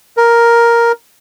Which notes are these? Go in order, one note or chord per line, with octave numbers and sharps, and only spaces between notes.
A#4